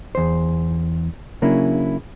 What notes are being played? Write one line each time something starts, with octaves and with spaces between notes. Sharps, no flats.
E2 C5
C#3 F#3 A#3 C#4 D4 E4